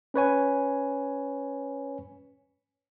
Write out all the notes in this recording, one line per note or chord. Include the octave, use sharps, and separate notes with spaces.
C#4 B4 C#5 G#5